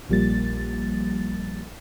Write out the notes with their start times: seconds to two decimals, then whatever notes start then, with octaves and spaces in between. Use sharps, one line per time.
0.10 A#1 F3 G3 A#3 A6